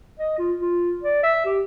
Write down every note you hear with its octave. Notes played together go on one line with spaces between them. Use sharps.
D#5
F4
F4
D5
E5
G4